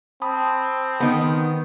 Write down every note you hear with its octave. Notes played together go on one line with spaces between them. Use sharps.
C4 A5 B5 D#6
D#3 B3